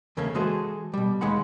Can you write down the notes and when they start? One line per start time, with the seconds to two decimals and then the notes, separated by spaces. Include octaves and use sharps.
0.17 E2 C#3 A3 A#3 C#4
0.34 E3 G#3 F#4 G#4 A4 C5
0.93 B2 G3
1.21 D#2 G#3 D#4 F#5 B5